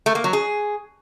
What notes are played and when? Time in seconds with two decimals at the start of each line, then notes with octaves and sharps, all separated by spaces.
0.06 A3
0.15 A#3
0.24 F#3
0.33 G#4